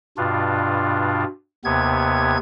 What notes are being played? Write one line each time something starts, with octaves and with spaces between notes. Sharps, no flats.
G2 B2 D4 F4
D#2 C3 B3 G#6